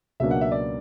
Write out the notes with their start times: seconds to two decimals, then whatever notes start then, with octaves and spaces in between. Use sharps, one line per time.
0.20 C#2 B2 F#3 A#3 D4 E5
0.31 F#5
0.41 E5
0.52 D5